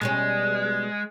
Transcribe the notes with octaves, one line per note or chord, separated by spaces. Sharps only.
B2 G3 G#3 C#4